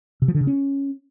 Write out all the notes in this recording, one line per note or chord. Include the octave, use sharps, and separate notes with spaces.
C3
F3
D3
C#3
C#4